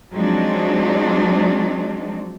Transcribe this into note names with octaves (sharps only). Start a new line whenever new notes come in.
F3 F#3 G#3 C4 D4 D#4